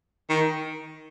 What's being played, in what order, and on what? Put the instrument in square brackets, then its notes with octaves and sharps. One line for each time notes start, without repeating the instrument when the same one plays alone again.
[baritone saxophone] D#3